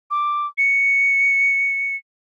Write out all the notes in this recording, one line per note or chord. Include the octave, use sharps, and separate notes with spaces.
D6
C#7